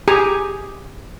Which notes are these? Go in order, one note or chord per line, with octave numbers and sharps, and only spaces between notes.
G4 G#4 G#5 A#5